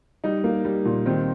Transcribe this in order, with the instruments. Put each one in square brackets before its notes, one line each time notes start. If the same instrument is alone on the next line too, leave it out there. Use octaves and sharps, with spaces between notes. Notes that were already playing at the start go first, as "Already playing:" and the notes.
[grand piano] G3 D#4
A#3
G3
A#2
D#3 C4